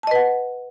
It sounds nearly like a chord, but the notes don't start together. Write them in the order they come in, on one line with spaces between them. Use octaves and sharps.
A5 D#5 B4 F#5